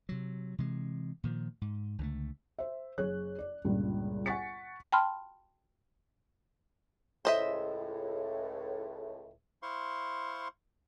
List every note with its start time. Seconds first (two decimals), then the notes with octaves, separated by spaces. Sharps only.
0.09 C3 F#3
0.58 C3 E3 G#3
1.24 A#2 D#3 F3
1.61 G#2
1.98 C#2 D3 F#3 A3
2.59 C5 E5
2.98 F#1 G#4 C#5 F#6
3.39 D5
3.64 G1 C#2 G2 A#2
4.26 F#5 G#5 C#6 A6 B6 C#7
4.92 G5 A5 B5 C6 F6
7.25 C#2 A2 C5 D#5 E5
9.63 E4 C5 F5 C6 C#6